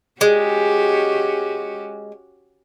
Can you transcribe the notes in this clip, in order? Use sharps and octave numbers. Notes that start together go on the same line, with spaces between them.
G#3 C#4 F#4 G4